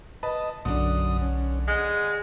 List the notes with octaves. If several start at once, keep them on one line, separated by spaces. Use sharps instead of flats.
B4 D#5 A5
B1 F#2 D3 D4 D#6
C#4
G#3 F#5 G#5